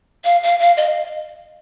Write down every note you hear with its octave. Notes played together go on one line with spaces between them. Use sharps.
F5
F5
F5
D#5